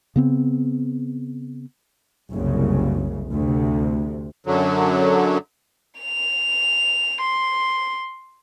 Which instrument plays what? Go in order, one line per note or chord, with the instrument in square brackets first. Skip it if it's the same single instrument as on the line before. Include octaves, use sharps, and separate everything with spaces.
[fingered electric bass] C#3 B3 C4
[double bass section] F#1 C2 C#3
D2 C3
[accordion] F#2 D3 F#3
[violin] F7
C6